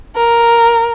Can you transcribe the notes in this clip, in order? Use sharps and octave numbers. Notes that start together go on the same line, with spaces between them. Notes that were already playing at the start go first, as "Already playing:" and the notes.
A#4